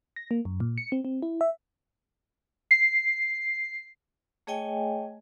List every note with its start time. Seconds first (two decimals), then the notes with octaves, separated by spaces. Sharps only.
0.16 A#6
0.31 A#3
0.45 F#2
0.60 A#2
0.78 C#7
0.92 C4
1.05 C4
1.22 E4
1.41 E5
2.71 C7
4.47 A3 G#4 C#5 D#5 G5 G#5